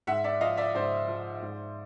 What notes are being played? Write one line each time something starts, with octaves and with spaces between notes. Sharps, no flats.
G#2 E5 F#5
D5 E5
F3 D#5 F5
D5 E5
G#2 C5 D5
F3
G#2